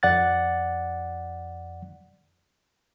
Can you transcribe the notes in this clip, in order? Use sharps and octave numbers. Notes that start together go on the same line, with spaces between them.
F2 D5 F#5 F#6 A6